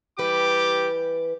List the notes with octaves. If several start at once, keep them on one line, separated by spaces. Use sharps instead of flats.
E3 G3 G4 B4 D6